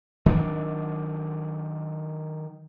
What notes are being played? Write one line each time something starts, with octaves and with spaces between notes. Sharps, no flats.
D#3 F#3 B3 D4